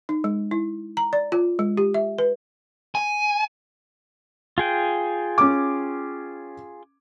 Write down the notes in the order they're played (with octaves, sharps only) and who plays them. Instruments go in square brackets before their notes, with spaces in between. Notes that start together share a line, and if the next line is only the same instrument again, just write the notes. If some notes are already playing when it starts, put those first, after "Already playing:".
[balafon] D#4
G#3
E4
A#5
D5
F4
G#3
G4
E5
B4
[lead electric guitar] G#5
[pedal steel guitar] F4 G#4 G5
[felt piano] C#4 D6